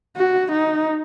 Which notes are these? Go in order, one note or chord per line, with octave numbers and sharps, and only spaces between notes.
F#4
D#4